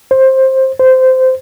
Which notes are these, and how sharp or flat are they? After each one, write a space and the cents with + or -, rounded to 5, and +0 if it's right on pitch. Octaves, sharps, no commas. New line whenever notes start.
C5 +15
C5 -15